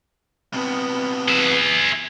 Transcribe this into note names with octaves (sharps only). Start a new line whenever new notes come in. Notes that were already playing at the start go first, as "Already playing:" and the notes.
C3 B3
G#4 E5